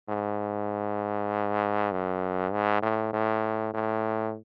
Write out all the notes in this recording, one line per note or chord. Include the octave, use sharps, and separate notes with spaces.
G#2
F#2
G#2
A2
A2
A2